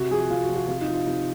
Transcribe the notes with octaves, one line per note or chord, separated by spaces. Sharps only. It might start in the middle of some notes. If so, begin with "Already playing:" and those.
Already playing: C3 F#4
F3 G#4
C3 F4
F#4
F3
F#4
C3 F4
D#4
F3
F4
C3 D#4